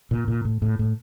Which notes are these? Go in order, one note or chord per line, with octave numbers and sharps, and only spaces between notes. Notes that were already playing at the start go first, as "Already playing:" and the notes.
A#2
A#2
A2
A2
A2